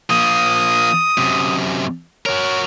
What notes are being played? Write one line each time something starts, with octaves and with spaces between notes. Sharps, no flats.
F3 A#3 D#6
F#2 C3
F#4 A#4 C#5